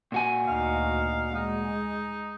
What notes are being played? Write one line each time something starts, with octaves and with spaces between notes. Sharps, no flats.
A#2 F#4 G#5
D2 D#4 F5
G#3 D#4